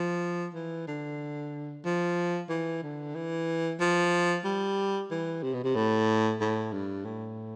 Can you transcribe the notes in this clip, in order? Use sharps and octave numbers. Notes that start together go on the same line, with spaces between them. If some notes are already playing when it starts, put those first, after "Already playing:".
Already playing: F3
E3
D3
F3
E3
D3
E3
F3
G3
E3
C3
B2
C3
A2
A2
G2
A2